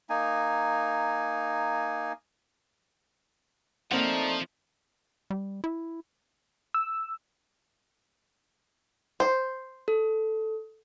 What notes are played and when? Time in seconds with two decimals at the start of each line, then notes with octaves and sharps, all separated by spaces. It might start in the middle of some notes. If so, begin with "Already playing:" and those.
0.10 A#3 D#4 G#5
3.91 F3 A3 A#3 C4 D4 D#4 F#5
5.30 G3
5.64 E4
6.74 E6
9.20 C5
9.88 A4